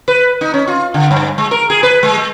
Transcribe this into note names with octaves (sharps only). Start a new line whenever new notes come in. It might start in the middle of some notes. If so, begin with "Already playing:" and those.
B4
D#4
C#4
F4
D3
G2
G#3
A#4
G#4
B4
G#3
G#3